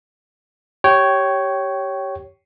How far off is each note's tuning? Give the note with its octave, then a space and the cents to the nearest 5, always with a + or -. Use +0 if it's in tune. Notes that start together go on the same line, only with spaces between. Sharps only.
G4 -10 C#5 +0 G5 -20